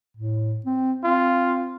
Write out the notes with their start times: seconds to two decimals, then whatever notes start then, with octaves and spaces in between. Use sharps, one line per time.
0.17 A2
0.66 C4
1.04 C4 F4